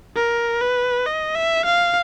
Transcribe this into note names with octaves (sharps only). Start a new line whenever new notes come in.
A#4
B4
D#5
E5
F5